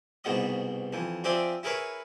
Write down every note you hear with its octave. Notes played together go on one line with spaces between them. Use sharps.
C2 G#2 B2 B3 D#5 D#6
F2 E3
F3 C4 G#4 D5 E5
E4 G#4 A#4 B4 C#5